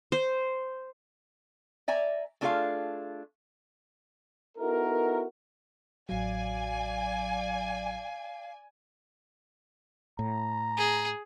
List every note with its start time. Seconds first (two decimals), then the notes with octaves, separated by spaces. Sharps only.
0.12 C5
1.88 D5 E5 G#5 A#5
2.41 A3 D4 F4 G#4 A#4 F5
4.58 B3 D#4 E4 F#4 A4 A#4
6.09 A1 F#3 D5 F5 G#5
10.19 A2 A#5
10.77 G#4